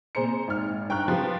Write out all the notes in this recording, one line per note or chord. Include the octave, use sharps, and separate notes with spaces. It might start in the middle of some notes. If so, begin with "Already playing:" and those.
A#2 C4 G#4 C5 A#5 C#7
G#1 F6
G2 G5 A#5 C#6 F#6
F3 F4 G4 B4